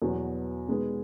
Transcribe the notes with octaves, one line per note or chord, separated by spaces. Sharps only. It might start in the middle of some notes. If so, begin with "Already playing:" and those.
E2 B2 F#3 B3 F#4
B2 G#3 D#4 G#4 B4